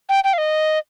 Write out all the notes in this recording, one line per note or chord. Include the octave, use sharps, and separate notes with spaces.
G5
G5
F5
D#5